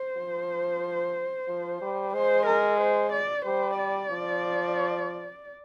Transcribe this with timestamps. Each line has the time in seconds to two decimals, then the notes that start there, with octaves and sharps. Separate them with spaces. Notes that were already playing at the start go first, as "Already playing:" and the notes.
Already playing: C5
0.17 F3
1.48 F3
1.81 G3
2.14 G#3 C5
2.46 A#4
2.80 C5
3.12 D5
3.45 G3 C5
3.79 D5
4.11 F3